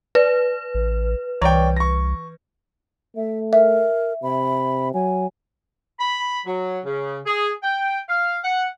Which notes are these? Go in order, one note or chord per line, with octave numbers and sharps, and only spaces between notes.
B4 D5
A1
C2 E3 C#5 D5 G5 A#5
C#6 A#6
A3 E5
A#4 E5
C3 B5
F#3 G#5
B5
F#3
C#3
G#4
G5
F5
F#5